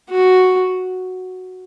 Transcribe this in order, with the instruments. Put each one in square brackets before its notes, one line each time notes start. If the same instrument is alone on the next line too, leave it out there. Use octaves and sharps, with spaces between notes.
[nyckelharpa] F#4